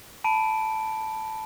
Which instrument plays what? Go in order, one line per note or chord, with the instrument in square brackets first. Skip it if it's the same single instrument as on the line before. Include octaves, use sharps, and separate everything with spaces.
[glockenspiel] A5 B5 D7